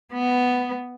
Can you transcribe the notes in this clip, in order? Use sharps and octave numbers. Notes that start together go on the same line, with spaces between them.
B3